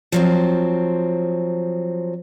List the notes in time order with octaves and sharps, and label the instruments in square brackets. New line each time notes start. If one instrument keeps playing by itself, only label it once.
[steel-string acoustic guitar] F3 F#3 C4